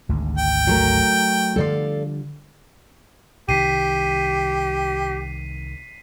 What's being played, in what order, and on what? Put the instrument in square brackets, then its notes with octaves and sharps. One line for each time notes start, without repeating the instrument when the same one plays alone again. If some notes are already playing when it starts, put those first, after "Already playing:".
[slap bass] G#1 D2 G#2
[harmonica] G5
[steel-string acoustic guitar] F#3 A3 A#4
[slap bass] D3 F3 G3 [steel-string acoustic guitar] A4 D5 F5
[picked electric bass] C2 C3 D#3 [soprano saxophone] G4 [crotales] B6 C7 D#7